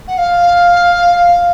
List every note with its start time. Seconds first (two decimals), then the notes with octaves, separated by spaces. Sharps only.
0.07 F#5
0.17 F5